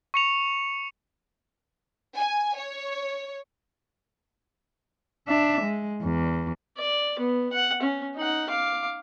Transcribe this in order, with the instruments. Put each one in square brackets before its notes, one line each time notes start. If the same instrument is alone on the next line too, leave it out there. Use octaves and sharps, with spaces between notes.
[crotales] C#6 C#7 F7
[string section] G#5
C#5
[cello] D4 E5
G#3
E2
[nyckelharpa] D5
B3
F#5
C#4
D#4 F#5
F5 D6